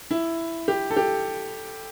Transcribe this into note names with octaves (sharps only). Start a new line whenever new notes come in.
E4
G4
A4
G4